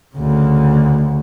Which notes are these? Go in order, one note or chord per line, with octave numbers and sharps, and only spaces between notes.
D2 C#3